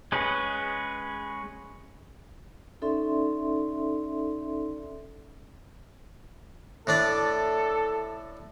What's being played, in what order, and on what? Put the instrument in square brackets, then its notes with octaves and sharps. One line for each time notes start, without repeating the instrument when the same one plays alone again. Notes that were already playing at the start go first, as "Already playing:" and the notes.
[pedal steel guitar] G#3 C#4 G#4 B4
[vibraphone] C#4 D#4 A4 D5 E5 C6
[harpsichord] A2 D4 D5 [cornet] A4